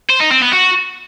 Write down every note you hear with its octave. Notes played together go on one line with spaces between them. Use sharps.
C5
D#4
C4
B3
F#4